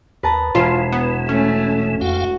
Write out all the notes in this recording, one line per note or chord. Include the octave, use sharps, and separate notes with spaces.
D#2 B4 A5 A#5
E1 B2 E3 F4 C7
B3
A3 C#4
F2 F#4 F5 G5